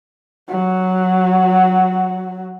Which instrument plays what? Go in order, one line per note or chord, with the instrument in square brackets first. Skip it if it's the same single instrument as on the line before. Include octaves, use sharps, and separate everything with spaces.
[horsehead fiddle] F#3 F#4